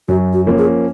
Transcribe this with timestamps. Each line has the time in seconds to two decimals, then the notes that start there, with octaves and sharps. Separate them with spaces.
0.08 F#2 F#4
0.33 F#4
0.46 F3 A#3 C#4
0.58 G#4